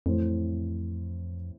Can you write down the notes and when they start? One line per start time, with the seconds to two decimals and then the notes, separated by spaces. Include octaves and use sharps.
0.06 F2 A2 E3 A3 C4